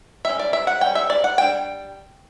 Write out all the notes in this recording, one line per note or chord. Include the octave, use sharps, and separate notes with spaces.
G3 C#4 E5
D5
E5
F#5
G3 C#4 G5
E5
D5
F#5
G3 D4 G5